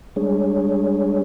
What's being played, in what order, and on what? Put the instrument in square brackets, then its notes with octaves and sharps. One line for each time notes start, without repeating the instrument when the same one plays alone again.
[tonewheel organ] G3 G#3 D4 G#4 C#5